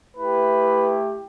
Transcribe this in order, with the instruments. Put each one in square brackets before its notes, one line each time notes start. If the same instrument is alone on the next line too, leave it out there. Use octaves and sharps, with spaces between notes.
[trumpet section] A3 E4 G4 B4